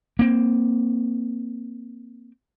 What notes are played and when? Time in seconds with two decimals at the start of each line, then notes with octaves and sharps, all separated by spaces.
0.19 A#3 C4